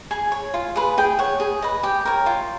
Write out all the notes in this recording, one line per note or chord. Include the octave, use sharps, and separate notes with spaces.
G#4 G#5
C#5
F4
G#4 B4
G#4 G5
C#5 F#5
G#4
B4 D#5
G4 G5
A#4 C#5
F4